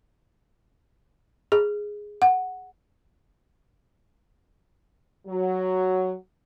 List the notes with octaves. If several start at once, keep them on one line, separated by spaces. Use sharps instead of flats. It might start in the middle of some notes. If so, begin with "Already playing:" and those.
G#4
F#5
F#3